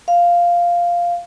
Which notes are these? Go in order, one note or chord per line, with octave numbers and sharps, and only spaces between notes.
F5